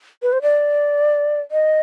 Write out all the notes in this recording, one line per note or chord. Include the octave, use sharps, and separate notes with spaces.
B4
C5
D5
D#5